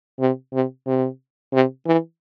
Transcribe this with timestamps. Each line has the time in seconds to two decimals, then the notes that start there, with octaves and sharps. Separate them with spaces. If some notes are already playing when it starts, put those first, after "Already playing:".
0.20 C3
0.53 C3
0.87 C3
1.53 C3
1.87 E3